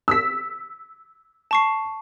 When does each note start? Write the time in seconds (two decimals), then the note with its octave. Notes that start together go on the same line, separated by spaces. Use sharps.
0.08 E6 B6
1.51 A5 C#6 C7